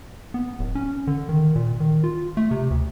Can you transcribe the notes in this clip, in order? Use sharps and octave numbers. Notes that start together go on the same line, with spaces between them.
B3
D1
C#4
D3
D#3
A#2
D#3
F4
A3
C3
D2